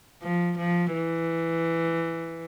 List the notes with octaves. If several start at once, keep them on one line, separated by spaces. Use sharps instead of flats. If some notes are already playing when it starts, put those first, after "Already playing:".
F3
F3
E3